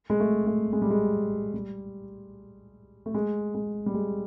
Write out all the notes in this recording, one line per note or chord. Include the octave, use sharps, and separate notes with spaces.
G#3
A3
A3
G#3
G3
G#3
G3
A3
G#3
G#3
G3
G#3